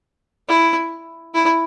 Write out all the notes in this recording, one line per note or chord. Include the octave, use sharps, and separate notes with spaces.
E4
E4